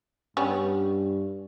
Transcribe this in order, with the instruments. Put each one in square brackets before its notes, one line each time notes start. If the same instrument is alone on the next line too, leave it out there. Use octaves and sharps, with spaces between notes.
[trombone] G2 [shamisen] G3 B3 C#4